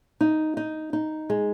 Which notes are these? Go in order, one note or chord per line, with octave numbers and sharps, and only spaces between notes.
D#4
D#4
D#4
G#3